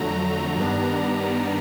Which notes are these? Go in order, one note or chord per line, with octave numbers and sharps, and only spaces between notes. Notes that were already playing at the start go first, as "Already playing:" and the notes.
Already playing: F2 D3 F#3 A3 A#5
G2 D#3 G3 B3 D4